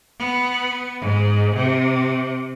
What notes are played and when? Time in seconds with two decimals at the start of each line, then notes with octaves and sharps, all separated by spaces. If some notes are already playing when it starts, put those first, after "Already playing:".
0.19 B3
1.00 G#2
1.55 C3